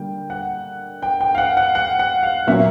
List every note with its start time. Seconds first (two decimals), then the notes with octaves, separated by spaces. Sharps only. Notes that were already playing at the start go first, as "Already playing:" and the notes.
Already playing: D3 G3 A#3 G5
0.30 F#5
1.02 G5
1.21 G5
1.35 F5
1.38 F#5
1.57 F#5
1.75 F#5
1.99 F#5
2.23 F5
2.47 A#2 F#3 A#3 C#4 E5